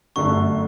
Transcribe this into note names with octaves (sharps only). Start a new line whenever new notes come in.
G1 F#2 D3 A3 C#6